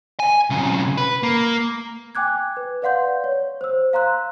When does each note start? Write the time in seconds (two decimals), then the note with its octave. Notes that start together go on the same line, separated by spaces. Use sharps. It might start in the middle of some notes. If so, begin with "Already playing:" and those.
0.20 G#5
0.50 B1 C#3
0.97 B4
1.23 A#3
2.15 G5 G#5 D6 F#6 G#6
2.57 B4
2.82 B4 D5 F5 F#5 C6 G6
3.24 C#5
3.61 C5 E6
3.93 F5 A#5 C6 F#6